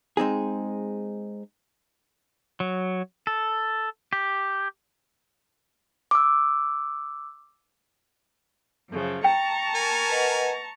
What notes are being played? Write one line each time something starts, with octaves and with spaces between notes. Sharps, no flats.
G#3 C4 D#4 G#4
F#3
A4
G4
D6 E6
F#2 C#3 F3
G5 A5 A#5 C#6
A#4 G#5
B4 D#5 F#5